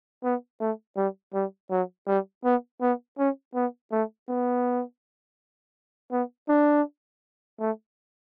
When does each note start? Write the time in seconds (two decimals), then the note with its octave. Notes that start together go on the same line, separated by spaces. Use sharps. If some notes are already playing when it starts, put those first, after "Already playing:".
0.24 B3
0.60 A3
0.97 G3
1.34 G3
1.71 F#3
2.07 G3
2.44 B3
2.81 B3
3.18 C#4
3.55 B3
3.92 A3
4.28 B3
6.12 B3
6.49 D4
7.60 A3